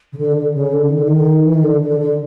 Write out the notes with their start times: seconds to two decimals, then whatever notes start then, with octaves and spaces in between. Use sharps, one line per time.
0.13 C#3
0.17 D3
0.36 D3
0.54 C#3
0.73 D3
0.90 D#3
0.99 D3
1.08 D#3
1.45 E3
1.54 D#3
1.63 D3
1.82 D3
2.00 D3